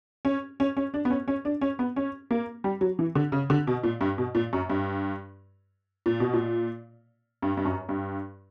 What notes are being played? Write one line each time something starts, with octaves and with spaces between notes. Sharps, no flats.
C#4
C#4
C#4
D4
B3
C#4
C#4
D4
C#4
B3
C#4
A#3
G3
F#3
E3
D3
C#3
D3
B2
A#2
G2
B2
A#2
F#2
G2
A#2
B2
A#2
G2
G2
F#2
G2